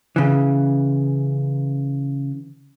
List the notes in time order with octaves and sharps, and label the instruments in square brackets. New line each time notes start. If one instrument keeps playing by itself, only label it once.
[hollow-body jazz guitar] C#3 E3